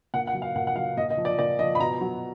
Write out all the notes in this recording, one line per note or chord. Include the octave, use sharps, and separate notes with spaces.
A#2 F#5
F#5
F#3
F5
A#2 F#5
F#5
F#3 F5
A#2 D#5
D#5
F3
D5
A#2 D5
F3 D#5
B5
B2 A#5
F#3